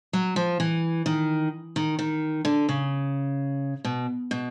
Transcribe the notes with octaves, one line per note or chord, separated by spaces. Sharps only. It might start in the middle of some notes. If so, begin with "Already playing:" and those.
F#3
F3
E3
D#3
D#3
D#3
D3
C#3
B2
B2